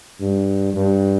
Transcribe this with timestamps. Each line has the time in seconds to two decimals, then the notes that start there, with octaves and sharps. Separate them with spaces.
0.20 G2
0.74 G2